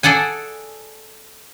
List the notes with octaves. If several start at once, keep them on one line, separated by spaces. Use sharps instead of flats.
G#4 A4 D5 F#5 G#5